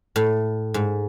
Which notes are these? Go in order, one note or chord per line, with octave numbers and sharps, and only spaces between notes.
A2
G#2